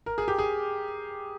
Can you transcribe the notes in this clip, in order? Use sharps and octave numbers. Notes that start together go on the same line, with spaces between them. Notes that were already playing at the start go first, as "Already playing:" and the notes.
A#4
G#4
G4
G#4